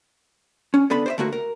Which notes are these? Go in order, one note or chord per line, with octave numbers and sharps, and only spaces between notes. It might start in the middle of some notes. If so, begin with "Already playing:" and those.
C#4
D3 B3 A4 B5
C5 D5 E5
D3 A3 A#3 F#4
A#4